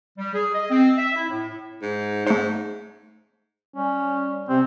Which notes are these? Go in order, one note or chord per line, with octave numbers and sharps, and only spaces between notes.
G3
G#4
D#5
C4
E5
E4
A2
G#2
G#2 A3 C5
G3 C#4
C3 C4